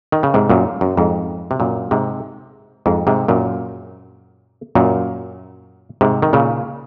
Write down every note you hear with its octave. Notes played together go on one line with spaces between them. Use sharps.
D#3
C#3
G#2 C3
F#2 A#2
F#2
F2 G#2
C3
F#2 A#2
G#2 C3
F2 G#2
G#2 C3
F#2 A#2
F#2 A#2
G#2 C3
D#3
A#2 C#3